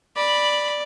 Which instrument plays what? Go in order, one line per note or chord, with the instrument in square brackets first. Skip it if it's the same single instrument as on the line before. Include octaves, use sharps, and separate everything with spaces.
[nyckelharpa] D5 [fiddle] B5